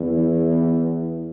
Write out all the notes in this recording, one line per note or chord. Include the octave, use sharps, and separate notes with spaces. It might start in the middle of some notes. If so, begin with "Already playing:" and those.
Already playing: E2